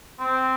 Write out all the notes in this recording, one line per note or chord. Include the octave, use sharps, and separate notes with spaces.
C4